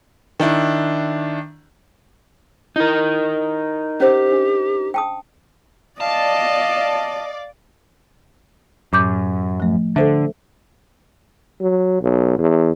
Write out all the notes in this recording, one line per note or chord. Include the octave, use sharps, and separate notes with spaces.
D#3 D4 E4
D#4 E4 A#4
C#4 G4 C5
D4
G5 A5 D#6
D5 D#5 F5 A5
F#2 A2 D6 G6
F3 A3
D3 A4 C5 E5
F#3
B1
E2